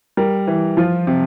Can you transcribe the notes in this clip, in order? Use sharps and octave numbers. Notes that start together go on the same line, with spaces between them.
G3 A#4
E3
F3 F4
C3